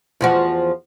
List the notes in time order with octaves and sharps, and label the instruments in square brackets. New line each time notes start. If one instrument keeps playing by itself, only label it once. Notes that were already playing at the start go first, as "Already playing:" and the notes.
[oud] E2 F3 F#4